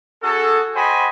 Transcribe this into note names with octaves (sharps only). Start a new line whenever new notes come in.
C#4 F#4 G#4 A4
F#4 C5 D#5 G5 G#5 B5